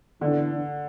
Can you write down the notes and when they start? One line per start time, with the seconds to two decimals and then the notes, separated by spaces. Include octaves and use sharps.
0.21 D3 E3 B3 D4